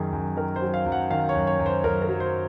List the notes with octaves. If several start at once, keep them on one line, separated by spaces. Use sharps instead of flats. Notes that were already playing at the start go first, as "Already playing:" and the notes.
Already playing: F#2 D#3 G#4
F#2
D#3 A#4
C5
F#3
F5
F#2
F#5
D#3 F5
C#5
F#2
C#5
F#2
C5
F#2 A#4
A#4
F#3
C5